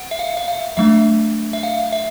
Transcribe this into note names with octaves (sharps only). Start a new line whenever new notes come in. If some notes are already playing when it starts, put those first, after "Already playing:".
Already playing: F#5
E5
F5
E5
F5
F#3 A3 D4 E5
E5
F5
E5